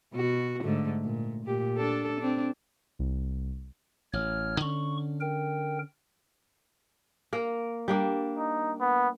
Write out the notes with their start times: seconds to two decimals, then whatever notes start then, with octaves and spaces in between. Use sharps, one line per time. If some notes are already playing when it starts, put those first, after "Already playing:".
0.13 B2 F#4
0.63 G#2 D3 A3
1.03 A#2
1.45 A#2 G4
1.77 D4 A4
2.20 C4 D4
2.99 C2
4.13 A1 C#5 F6
4.60 D3 C#4 C#6
5.21 A#4 G5
7.33 A#3 A#4
7.88 G3 A#3 D4
8.38 D#4
8.81 B3